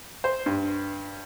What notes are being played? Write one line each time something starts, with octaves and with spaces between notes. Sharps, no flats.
C5
G2